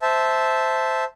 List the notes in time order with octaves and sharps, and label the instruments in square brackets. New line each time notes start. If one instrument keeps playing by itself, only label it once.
[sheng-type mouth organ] C5 E5 A5